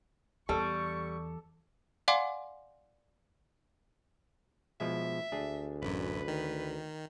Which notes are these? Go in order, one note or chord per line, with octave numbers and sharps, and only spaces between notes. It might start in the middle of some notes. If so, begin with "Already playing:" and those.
E2 G3 A4 C#6
D5 F5 F#5 G#5 C6 D6
B2 F3 G#3 E5
D2 D4 G#4
A1 F#2 B4
D#3